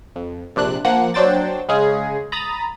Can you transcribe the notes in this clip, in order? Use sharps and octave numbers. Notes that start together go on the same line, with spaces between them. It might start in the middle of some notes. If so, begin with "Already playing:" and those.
F2
A#1 C3 D4 F#6
F3 A#3 F#5 F#6
F#3 D4 C5 G5 A6
C#3 G#3 C#4 G#4
A#5 B5 D#6 A6